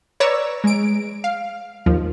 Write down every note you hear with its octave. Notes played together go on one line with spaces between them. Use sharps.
B4 C#5 D5 A#5 E6
G#3 D7
F5
D#2 F3